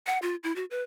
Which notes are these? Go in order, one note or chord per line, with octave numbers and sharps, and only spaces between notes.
F#5
F4
E4
F#4
B4